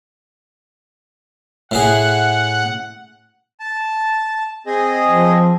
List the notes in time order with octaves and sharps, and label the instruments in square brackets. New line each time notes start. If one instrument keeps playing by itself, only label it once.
[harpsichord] A2 E4 G#4 [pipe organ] F#5
[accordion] A5
C4 G#4 D#5
[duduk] F3